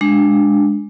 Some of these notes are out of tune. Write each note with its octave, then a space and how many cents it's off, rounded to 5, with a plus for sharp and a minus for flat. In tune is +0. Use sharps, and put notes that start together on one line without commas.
G#3 +0 D4 +0